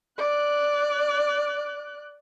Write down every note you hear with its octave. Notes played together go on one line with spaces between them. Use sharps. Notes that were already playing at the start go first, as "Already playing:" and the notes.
D5 F#6